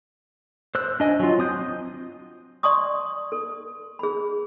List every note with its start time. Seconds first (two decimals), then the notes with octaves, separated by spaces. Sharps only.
0.75 C5 E6 F#6
1.00 D4 D#5 G#5
1.19 F#3 F4
1.39 C4 D#6 G6
2.63 D5 A5 C6 C#6 D#6
3.32 A4
3.99 G#4 B5